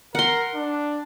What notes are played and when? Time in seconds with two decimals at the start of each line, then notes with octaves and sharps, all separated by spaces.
0.15 A#4 F#5 C6
0.55 D4